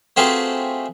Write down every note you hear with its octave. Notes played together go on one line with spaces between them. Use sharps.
A3 C4 F4 F#4 G#4 B4